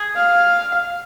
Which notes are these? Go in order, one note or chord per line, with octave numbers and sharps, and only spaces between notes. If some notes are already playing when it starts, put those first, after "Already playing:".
Already playing: G#4
F5